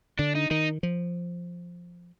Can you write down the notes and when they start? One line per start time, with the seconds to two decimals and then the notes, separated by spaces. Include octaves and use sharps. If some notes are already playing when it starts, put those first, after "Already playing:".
0.19 D3 D4
0.35 D#4
0.51 D#3 D#4
0.83 F3